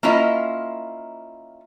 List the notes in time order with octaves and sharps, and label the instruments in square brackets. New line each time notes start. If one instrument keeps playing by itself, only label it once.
[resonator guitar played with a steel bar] A#3 C#4 E4 F4 D#5